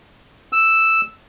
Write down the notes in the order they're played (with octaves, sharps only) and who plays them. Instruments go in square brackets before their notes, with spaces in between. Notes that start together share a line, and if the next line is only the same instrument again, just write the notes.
[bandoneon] E6